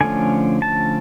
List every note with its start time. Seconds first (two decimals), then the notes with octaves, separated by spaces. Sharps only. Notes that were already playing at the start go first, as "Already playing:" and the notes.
0.01 D3 F3 A3 C#4 G#5
0.62 A5